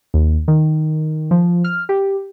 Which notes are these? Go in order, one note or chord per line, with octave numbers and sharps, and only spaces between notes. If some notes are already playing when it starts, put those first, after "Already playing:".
D#2
D#3
F3
F6
G4